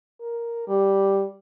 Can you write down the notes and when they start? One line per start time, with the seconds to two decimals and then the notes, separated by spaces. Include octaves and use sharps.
0.21 A#4
0.68 G3